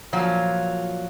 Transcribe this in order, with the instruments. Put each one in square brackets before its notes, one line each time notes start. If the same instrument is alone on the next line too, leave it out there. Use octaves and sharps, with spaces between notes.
[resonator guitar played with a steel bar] A#2 F3 F#3 F4 F#4